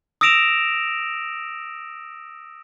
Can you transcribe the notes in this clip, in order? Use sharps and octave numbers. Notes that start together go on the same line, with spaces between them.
D#6 E6 A#6 D7 E7 F7